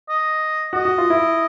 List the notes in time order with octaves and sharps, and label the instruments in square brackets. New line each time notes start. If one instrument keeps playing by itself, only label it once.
[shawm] D#5
[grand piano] F#4 [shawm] D#5
[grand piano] F#4
F4
E4